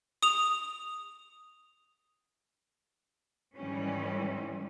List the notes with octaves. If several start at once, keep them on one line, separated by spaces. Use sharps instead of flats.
D#6 F7
G#2 D#3 E3 G3 C#4